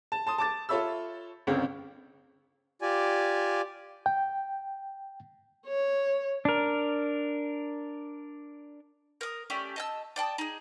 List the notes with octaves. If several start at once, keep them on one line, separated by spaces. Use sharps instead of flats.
A5
A5 C6 D#6
A5 D6 A6
F4 A4 C#5 E5 B5 E6
G1 C#2 C#3 C4
F4 G4 D5 G#5
G5
C#5
D4 A#4
A#4 D#6
A3 C#4 G4 D5
D#5 A5 E6
D5 G5 A5 D#6
D#4 G#4